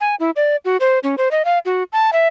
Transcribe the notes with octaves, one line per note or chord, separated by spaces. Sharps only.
G#5
E4
D5
F#4
C5
C#4
C5
D#5
F5
F#4
A5
E5